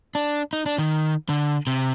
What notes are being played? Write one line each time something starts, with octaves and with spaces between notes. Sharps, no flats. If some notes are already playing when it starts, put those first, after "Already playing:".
D4
D#4
D4
D#3
D3
C3